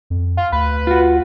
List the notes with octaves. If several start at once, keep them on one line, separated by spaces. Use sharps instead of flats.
F2
F4
D2 B4
F4 F#4